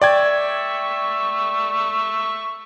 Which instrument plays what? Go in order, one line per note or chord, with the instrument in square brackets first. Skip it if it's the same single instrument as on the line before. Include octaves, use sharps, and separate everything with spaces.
[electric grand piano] D5 G5 G#6 [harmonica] E5 C#6